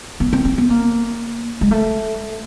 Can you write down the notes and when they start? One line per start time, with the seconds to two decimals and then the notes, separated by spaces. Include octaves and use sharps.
0.20 B3
0.33 C4
0.45 C4
0.58 B3
0.70 A#3
1.61 G#3
1.71 A3